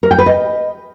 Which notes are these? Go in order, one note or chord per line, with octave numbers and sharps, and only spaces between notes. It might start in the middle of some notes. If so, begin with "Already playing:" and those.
A#4
G5
B4
D#5